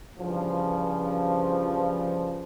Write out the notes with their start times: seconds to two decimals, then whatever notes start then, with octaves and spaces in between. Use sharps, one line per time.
0.20 G2 C#3 E3 F3